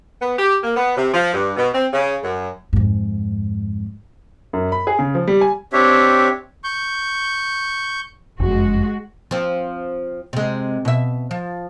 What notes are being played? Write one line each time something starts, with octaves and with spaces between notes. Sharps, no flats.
B3
G4
A#3
B3
C3
F3
G2
B2
C4
C#3
F#2
F2 G#2
F#2
B5
G#4
C#3
F3
G3
G#5
C4 D4 G4 C#5 E5
C#6 G6
F#1 F2 G#3 F#4
F3 C4
C3 G#3
B2 E5
F3